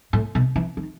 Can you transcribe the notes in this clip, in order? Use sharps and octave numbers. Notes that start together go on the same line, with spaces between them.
A2
B2
E3
D#3